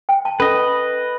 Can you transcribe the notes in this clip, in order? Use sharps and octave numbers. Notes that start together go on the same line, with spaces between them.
G5
A5
C#4 A4 B4 D#5